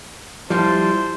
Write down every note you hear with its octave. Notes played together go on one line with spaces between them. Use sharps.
F3 G3 E4 C5 A5